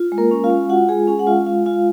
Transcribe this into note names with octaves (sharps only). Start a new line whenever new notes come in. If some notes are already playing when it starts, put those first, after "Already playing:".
Already playing: F4
G#3
A#3 A#4
C#4
F4 F5
G#3
F4 F#4 F#5
G#3 G#4 G#5
C#4 G#4 G#5
F#5
G#3 F4 F5
F4 F5
G#3 F4 F5